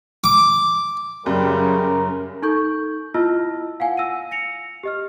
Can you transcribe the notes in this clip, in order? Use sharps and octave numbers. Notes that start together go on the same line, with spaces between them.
D6
F#2 C#3 G3 A#4
D#4 A4 C#6 G6
E4 F4 D#5 A5 E6 F6
F5 F#5 G#5
E6 A#6 D#7
A#6 C#7 F7
G4 D#5 F6